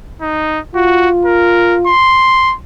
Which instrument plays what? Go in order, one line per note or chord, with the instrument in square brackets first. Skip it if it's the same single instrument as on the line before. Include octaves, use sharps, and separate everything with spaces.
[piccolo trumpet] D#4
[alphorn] F4 [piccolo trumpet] F#4
[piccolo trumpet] A#4
C6